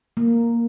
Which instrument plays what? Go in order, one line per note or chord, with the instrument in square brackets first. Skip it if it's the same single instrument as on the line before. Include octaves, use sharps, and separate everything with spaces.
[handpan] A#3